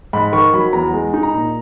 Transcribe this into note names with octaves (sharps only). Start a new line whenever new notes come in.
G#2 B5
D#3 C#6
F#3 B5
E2 A#5
G#3
D#4
A#5
A#2